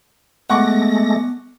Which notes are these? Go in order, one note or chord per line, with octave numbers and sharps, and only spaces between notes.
G#3 A3 B3 F#5 C#6 D6 A#6